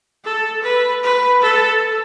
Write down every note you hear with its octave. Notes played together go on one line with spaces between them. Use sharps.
A4
B4
B4
A4